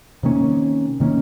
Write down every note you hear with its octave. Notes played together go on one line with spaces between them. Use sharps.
C3 D#3 A#3 C#4
C3 D#3 A#3 C#4